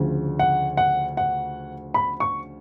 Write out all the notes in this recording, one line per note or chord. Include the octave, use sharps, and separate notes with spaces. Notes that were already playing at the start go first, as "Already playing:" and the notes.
Already playing: D2 C#3 F3
F#5
F#5
F#5
B5
C#6